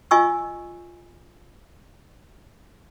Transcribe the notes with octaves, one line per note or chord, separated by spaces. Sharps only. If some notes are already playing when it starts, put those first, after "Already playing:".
F4 D#5 G#5 C#6 E6